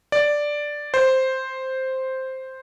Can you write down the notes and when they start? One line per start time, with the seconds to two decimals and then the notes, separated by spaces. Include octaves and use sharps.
0.12 D5
0.94 C5